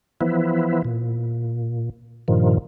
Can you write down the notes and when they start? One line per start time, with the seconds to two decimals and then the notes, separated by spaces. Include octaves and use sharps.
0.21 E3 F3 B3 E4
0.85 A#2
2.28 G2 A#2 D#3 F3